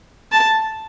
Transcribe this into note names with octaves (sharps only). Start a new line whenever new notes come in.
A5